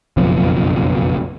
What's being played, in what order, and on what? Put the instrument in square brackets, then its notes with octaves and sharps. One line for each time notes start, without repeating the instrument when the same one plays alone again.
[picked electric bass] F#1 B1 F2 F3